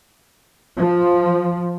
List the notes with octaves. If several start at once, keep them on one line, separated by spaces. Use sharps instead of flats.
F3